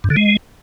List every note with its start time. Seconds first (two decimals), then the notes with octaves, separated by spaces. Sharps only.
0.04 G2
0.10 D3
0.17 G#3